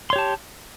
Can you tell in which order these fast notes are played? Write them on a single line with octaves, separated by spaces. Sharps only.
C6 C#5 G4 A5